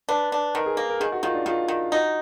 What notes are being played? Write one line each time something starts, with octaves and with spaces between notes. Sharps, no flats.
D4 B4
D4
D#3 A#4
G#4
A#3 A#4
A#4
D#3 G#4
F#4
D#3 F4
D4
D#3 F4
D#3
D#4 F#4